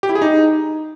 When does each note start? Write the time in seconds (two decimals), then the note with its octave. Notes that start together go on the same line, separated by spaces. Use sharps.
0.03 G4
0.09 E4
0.15 G#4
0.22 D#4